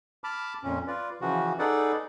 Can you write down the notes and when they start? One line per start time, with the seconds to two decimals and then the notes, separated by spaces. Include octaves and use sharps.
0.24 A5 B5 D6 F6
0.64 F2 A#2 C#4
0.87 F4 B4 D5
1.21 C#3 E3 F3 F#4
1.59 D#4 G#4 A4 B4 D5 F#5